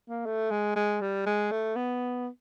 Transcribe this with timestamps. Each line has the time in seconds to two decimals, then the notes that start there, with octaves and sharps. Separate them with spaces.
0.09 A#3
0.26 A3
0.51 G#3
0.76 G#3
1.01 G3
1.26 G#3
1.51 A3
1.76 B3